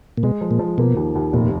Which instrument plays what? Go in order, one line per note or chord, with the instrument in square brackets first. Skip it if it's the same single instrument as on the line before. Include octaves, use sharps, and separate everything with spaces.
[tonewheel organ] A#2
[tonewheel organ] B2 [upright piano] G#3
[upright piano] F3
[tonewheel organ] A#2
[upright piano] F3
[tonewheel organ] B2 [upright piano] A#3
[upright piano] D#2
D#2
[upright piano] F1 [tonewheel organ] A#2